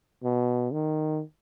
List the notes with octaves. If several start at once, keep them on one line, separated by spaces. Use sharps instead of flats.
B2
D#3